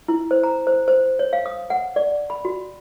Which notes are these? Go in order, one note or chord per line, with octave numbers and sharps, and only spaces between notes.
E4
C5
A#5
C5
C5
C#5
F5
D#6
F#5
D5
B5
F#4